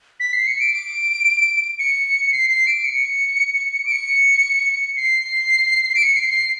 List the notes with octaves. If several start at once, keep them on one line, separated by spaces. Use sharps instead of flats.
B6
C7
C#7
D7
D7
C#7
C7
C7
D7
C#7
D7
C#7
C7
D7
C#7
C7
C7